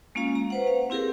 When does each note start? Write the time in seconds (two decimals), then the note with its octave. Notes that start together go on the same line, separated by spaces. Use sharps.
0.15 G#3 A#3 C#4 F4 F5 A#5
0.35 A#5
0.50 B4 C5 F#5
0.67 F5
0.90 C4 E4 G4 G#4 A#4